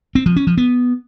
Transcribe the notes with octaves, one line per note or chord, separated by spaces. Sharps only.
C4
F3
C#4
F3
B3